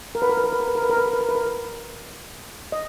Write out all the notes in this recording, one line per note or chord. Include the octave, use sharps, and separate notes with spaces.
A#4
B4
A#4
B4
A#4
B4
A#4
B4
A#4
B4
A#4
B4
A#4
B4
A#4
B4
A#4
B4
D#5